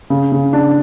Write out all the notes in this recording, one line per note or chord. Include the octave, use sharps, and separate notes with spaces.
C#3
C#3
D4